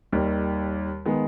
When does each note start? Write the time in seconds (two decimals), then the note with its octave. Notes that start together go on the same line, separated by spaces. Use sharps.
0.12 D#2 D#3 G3
1.06 D#3 G#3 B3